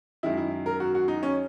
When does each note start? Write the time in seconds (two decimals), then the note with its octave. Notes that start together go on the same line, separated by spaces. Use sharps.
0.23 F#2 D#3 G#3 E4
0.37 E4
0.66 A#4
0.80 F#4
0.95 F#4
1.08 D#4
1.23 C#4